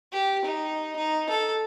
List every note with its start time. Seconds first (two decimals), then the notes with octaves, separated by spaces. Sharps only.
0.12 G4
0.45 D#4
0.96 D#4
1.29 A4